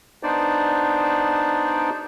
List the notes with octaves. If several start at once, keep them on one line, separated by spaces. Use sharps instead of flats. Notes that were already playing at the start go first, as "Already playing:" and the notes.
B3 D4 D#4 C5 D5